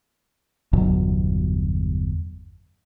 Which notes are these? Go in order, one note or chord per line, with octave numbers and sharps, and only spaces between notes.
G1 E2 B2 F#3